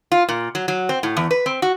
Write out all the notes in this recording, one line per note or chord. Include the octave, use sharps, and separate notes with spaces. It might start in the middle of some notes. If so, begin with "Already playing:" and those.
F4
A#2
F#3
F#3
C4
A2
E2
B4
C4
F#4